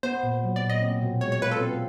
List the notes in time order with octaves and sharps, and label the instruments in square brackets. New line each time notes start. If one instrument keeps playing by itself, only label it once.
[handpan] B3 [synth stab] C5
[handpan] A#2
F#3
[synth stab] D5
[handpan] A#2
[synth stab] D#5
[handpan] C4
B2
[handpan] G#3 [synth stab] C#5
[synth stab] C#5
[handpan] F4 [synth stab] B4
[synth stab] A4
[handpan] C4